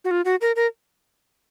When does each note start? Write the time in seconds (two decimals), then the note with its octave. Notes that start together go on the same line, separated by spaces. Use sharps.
0.05 F#4
0.11 F4
0.25 F#4
0.41 A#4
0.56 A#4